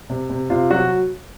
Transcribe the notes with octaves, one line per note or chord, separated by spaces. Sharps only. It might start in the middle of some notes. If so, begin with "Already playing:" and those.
C3
C3
C3 F4
F#3 F#4